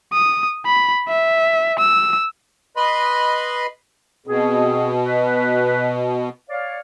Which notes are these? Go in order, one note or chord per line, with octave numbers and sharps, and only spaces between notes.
D#6
B5
E5
E6
B4 D#5 B5 C6
B2 C4 G#4
B4
C#5 D5 F5